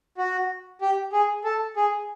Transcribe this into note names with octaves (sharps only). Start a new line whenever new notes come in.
F#4
G4
G#4
A4
G#4